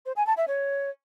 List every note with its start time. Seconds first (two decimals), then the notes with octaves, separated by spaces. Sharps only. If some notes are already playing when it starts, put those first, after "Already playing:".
0.06 C5
0.16 G#5
0.27 A5
0.37 E5
0.48 C#5